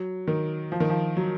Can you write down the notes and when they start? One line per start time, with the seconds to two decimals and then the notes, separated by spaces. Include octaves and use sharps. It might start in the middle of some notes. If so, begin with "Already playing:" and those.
Already playing: F#3
0.27 D#3
0.72 F3
0.80 D#3
0.90 F3
1.17 F#3